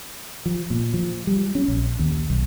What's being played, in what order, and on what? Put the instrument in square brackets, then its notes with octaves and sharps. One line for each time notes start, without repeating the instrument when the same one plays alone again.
[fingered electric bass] F3
A#2
F3
G3
C#4
A#1
D#2
B1